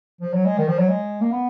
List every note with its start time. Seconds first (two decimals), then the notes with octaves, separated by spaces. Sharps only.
0.21 F3
0.34 F#3
0.46 G#3
0.58 D#3
0.68 F3
0.79 F#3
0.89 G#3
1.21 A#3
1.32 B3